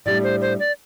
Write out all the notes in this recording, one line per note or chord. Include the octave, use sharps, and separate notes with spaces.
A2 G3 D4 D5
C5
C5
D5